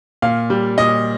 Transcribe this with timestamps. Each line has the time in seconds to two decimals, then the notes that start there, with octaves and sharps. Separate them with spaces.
0.22 A#2 F5
0.50 G3
0.78 A#2 D#5